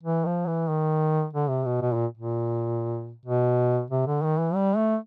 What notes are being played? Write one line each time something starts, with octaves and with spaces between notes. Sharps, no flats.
E3
F3
E3
D#3
D3
C3
B2
B2
A#2
A#2
B2
C3
D3
D#3
E3
G3
A3